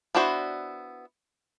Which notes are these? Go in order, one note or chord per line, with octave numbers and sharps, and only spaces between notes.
B3 D4 E4 F#4 C5